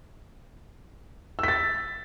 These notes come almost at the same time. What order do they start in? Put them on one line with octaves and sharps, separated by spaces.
E6 B6 A6